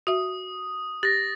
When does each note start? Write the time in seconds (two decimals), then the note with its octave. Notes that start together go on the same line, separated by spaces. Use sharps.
0.07 F#4 E5 D#6
1.03 G4 A6 A#6